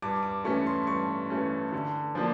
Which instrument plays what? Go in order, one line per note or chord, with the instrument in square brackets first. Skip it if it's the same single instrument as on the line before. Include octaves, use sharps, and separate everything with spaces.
[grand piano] G2 D6
D6
E3 A3 C#4 C#6
C6
G2 C#6
E3 A3 C#4
D3
F3 A#3 D4